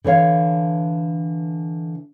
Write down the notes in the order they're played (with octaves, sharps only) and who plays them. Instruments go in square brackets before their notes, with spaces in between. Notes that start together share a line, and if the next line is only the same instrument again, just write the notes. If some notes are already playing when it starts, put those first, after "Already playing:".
[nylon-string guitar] D3 E3 C#5 F5